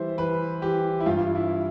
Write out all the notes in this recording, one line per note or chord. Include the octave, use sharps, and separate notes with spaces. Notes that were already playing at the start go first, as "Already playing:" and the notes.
Already playing: E3 G3 C5 E5
E3 B4
E3 G4
E4
G2 F4
E4